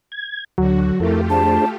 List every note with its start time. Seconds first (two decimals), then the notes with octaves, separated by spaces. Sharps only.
0.12 G#6
0.58 D2 D3 F#3 F#4
1.00 F2 A3 E4 F4 G4 A4 A#4
1.30 D4 G#4 C5 A5